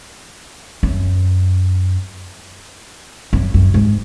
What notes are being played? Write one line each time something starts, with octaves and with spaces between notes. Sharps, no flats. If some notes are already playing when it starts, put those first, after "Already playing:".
F#2
F#2
F#2
G#2